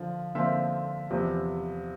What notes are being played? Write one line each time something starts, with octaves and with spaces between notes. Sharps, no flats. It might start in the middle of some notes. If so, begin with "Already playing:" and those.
Already playing: D3 F3 F4
D3 F3 C4 F4 E5
E2 C3 F3